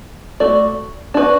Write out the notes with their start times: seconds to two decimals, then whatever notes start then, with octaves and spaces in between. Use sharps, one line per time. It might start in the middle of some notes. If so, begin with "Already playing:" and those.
0.40 A3 F#4 D5
1.14 D4 F#4 B4